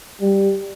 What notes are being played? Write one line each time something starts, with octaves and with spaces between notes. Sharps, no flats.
G3